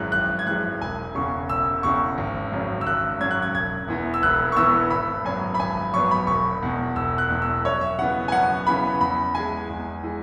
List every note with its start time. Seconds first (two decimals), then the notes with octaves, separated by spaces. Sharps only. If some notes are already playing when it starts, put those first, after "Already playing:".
Already playing: G#1 F#2 E3 G#3 F#6
0.12 G#1 F#6
0.39 G#6
0.47 F#2 E3 G#3 F#6
0.82 E1 G#5
1.15 E2 C#3 C#6
1.49 E1 E6
1.83 E2 C#3 C#6
2.18 G#1
2.52 F#2 C#3 F#3
2.81 E6
2.86 G#1 F#6
3.20 F#2 C#3 F#3 G#6
3.31 F#6
3.42 G#6
3.54 E1 G#6
3.88 E2 E3 B3
4.14 E6
4.23 E1 F#6
4.52 C#6
4.56 E2 E3 B3 E6
4.90 G#1 B5
5.25 F#2 F#3 B3 G#5
5.54 B5
5.59 G#1 G#5
5.94 F#2 F#3 B3 C#6
6.11 B5
6.27 E1 C#6
6.62 E2 B2
6.96 E1 E6
7.18 F#6
7.30 E2 B2
7.42 E6
7.64 F#2 C#5
7.81 E5
7.98 C#3 E3 B3 F#5
8.28 G#5
8.32 F#2 F#5
8.67 C#3 E3 B3 B5
9.01 E2 B5
9.35 E3 G#3 G#5
9.69 E2
10.03 E3 G#3